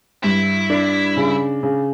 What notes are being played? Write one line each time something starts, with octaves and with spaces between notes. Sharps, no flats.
G2 E4
D4
C#3
C#3